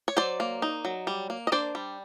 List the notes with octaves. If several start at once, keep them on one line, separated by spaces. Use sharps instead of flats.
C#5
F#3 C5 D5
A#3
D#4
F#3
G3
A#3
D#5
D4 C5 D5
G3